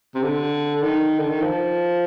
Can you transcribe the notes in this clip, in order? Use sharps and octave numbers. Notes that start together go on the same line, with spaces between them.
C3
D3
D#3
D3
D#3
F3